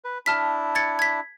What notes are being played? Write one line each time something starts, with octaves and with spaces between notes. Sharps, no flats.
B4
D4 E4 A5 F6 B6
G#6 A6 C#7
G#6 B6